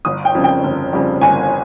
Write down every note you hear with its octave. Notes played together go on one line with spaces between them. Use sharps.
G1 D#6
G5
F2 C#3 G3
G5
G1
F2 C#3 G3
G1 G#5